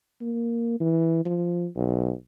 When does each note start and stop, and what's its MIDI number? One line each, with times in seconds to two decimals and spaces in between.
0.21 0.80 58
0.80 1.22 52
1.25 1.67 53
1.76 2.12 35